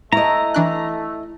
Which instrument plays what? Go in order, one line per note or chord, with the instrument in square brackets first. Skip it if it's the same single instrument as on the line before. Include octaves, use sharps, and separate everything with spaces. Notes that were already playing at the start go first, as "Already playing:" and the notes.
[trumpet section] A3 [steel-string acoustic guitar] E4 D#5 [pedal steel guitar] A#5
[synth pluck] E3 D4 F#6